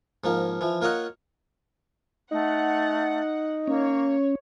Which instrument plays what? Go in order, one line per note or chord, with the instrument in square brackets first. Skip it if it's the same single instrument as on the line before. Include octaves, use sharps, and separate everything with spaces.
[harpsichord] G#2 F3 A#3
E3 F3
A#3 F4 C#5 D#5 F#5
[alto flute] A3 [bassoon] D#4 [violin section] F#5
[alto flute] A#3 [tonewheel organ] C#4 [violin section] C#5